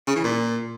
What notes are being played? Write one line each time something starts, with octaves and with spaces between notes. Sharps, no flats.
C#3
E3
A#2